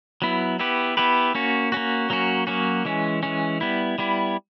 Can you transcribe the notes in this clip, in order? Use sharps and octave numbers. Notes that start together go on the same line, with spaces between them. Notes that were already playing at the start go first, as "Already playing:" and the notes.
F#3 B3 E4
B3 E4 G4 B4
B3 E4 G4 B4
A#3 C#4 F#4
A#3 C#4 F#4
F#3 A#3 C#4 F#4
F#3 A#3 C#4 F#4
E3 G#3 C#4
E3 G#3 C#4
G3 B3 E4
G3 B3 E4